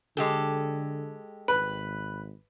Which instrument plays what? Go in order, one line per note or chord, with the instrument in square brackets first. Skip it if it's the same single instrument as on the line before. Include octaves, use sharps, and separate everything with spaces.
[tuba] D3 [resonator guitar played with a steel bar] G#3 G4 A4
[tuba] G#1 [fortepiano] B4